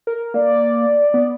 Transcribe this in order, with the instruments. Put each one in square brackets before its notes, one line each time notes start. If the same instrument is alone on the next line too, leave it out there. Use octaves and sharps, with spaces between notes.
[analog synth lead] A#4
[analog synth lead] A#3 [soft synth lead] D5
[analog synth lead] B3